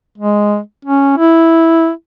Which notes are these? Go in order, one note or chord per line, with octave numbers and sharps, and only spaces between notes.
G#3
C#4
E4